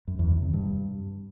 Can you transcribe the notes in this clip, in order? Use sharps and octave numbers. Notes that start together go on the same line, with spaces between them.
F#2
E2
D#3
C3
G2